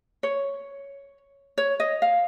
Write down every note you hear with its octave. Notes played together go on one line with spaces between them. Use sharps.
C#5
C#5
D#5
F5